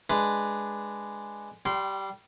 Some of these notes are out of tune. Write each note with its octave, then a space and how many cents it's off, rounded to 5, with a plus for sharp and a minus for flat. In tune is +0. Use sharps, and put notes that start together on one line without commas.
G#3 +0 D4 +5 B4 +0
G3 -10 G5 -35 C6 -5